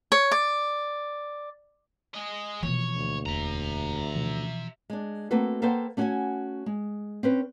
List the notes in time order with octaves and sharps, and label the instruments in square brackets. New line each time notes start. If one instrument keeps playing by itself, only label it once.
[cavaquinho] C#5
D5
[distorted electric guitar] G#3 D#5
[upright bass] B2 A#3 [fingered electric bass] E3 F3 [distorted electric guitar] C#5
[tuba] D2
[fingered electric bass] E1 [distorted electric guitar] E5 A#5
[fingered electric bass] B2 E3 F3
[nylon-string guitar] G#3 D4
A3 A#3 C4 F#4 A4 B4
A#3 A4 B4 C5 F#5 G5
A3 C#4 F#4 D#5 F#5 G#5
G#3
C4 C#4 B4